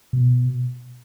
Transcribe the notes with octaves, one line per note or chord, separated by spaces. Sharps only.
B2